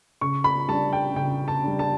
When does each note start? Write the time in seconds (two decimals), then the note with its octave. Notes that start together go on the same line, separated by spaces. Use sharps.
0.21 C#3 C#6
0.44 B5
0.68 G3 D4 A5
0.93 G5
1.16 C#3 G5
1.48 A5
1.63 G3 D4
1.79 A5